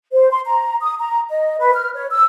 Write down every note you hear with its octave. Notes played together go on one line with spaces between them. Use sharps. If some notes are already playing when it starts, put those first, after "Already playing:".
C5
C6
A#5
D#6
A#5
D#5
B4
F6
C#5
E6